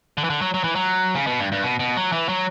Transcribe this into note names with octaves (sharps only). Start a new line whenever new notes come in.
D3
E3
D3
F#3
F#3
E3
F#3
C#3
B2
G2
G2
B2
B2
F#3
E3
F#3